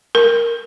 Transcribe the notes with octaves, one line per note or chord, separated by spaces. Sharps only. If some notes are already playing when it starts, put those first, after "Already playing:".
A#4